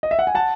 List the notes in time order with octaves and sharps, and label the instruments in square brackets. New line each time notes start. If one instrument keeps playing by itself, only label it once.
[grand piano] D#5
E5
F#5
G#5
F#5 A5